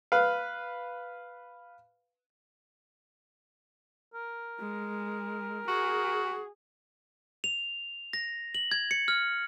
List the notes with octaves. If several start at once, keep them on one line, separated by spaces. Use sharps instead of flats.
B4 F5
A#4
G#3
F#4 G#4
F7
A#6
F#7
G#6
C#7
F6